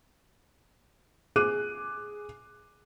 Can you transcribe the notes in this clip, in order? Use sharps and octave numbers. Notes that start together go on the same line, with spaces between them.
G#4 D6 F#6 D#7